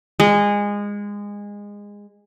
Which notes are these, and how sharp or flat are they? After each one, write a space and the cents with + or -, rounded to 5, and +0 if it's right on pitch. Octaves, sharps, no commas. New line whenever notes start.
G#3 -20